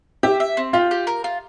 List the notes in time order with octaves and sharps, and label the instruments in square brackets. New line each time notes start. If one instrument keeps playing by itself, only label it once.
[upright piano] G4 [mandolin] E5
[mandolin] E5
C4
[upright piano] F4 [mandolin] G4
[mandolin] G4
A#4
F4